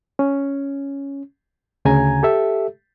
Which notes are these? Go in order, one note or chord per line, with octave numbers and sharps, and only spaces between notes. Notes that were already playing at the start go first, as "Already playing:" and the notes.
C#4
D2 C#3 G#5 A#5 G#6
G4 A4 E5